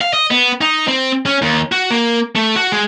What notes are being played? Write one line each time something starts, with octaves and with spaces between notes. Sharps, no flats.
F5
D#5
B3
D#4
C4
C#4
D#2
F#4
A#3
A3
F#4
G#3